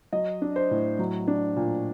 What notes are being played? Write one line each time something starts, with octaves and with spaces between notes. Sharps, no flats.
F#3 D#5
D4
C5
A2
F#3
D4
A#2